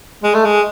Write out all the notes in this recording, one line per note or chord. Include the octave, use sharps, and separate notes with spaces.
G#3
A3
G#3